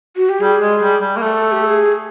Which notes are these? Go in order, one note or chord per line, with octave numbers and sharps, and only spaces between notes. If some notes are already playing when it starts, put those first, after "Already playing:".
F#4
G4
G3 G#4
G#3
G3
G3
A#3
A3 A4
G4
A4
G#4